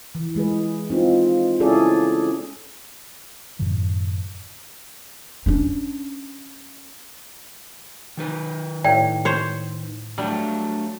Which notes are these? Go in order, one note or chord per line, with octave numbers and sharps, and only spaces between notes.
E3
E3 G#3 G#4 B4
C4 D#4 F4
C#4 E4 G#4 A4 D5
F#2 A2 D#3 F#3
C#4 D4
D#3 D#4 B4
A2 D5 G5
C5 C#5
F#3 G3 A3 D4